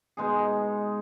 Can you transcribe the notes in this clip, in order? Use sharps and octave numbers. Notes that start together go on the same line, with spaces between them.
B2 G#3 D#4 G#4